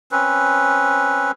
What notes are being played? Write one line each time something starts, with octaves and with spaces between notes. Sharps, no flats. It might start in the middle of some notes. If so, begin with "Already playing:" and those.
C4 C#4 B4